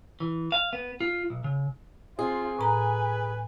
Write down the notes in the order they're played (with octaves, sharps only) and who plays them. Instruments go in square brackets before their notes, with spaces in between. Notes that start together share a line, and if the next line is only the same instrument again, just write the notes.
[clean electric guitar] E3
F5
B3
F4
B1
C#3
[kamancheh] C4 F4 [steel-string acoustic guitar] G#4
[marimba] A2 A#5 [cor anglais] B4 [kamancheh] G#5